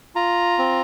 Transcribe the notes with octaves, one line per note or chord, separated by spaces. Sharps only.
F4 A#5
C4